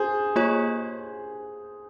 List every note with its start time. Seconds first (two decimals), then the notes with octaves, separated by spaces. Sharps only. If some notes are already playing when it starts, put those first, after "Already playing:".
Already playing: G#4 C5
0.36 A#3 F4 G#4 C#5